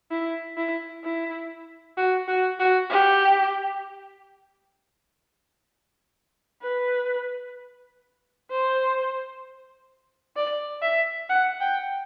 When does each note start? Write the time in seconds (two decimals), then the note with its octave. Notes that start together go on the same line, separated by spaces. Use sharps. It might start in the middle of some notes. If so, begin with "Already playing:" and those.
0.11 E4
0.57 E4
1.04 E4
1.97 F#4
2.28 F#4
2.59 F#4
2.90 G4
6.63 B4
8.50 C5
10.36 D5
10.82 E5
11.29 F#5
11.61 G5